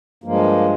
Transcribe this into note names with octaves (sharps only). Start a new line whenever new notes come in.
G2 F3 G#3 A#3